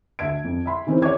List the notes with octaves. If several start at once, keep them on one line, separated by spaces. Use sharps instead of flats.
D2 E5 G#6 D7
F2
E5 B5 C6
D#3 E3 C4 C#4 E4 C5
C#5 C#6 D6 G#6